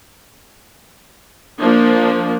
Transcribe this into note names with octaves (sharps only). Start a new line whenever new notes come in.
F3 A#3 D4